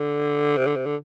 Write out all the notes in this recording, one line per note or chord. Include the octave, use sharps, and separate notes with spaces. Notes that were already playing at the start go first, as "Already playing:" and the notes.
Already playing: D3
C3
D3
C3
D3